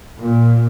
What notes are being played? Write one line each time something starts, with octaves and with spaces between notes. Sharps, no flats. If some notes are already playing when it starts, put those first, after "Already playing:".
A#2